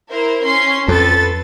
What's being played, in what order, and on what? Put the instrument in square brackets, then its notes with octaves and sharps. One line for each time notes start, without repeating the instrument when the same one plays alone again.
[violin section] E4 A#4 C5
C#4 C6
[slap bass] F2 [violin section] A4 B4 A6